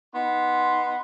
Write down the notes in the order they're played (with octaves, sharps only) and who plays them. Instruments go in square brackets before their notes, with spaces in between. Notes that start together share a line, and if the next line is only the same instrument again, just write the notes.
[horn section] B3 D#4 C6